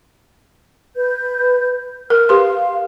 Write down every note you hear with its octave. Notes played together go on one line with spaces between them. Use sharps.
B4 G6
A#4 F6
G4 B4 F5 C6